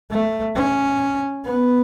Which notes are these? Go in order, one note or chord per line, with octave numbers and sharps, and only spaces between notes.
A3
C#4
B3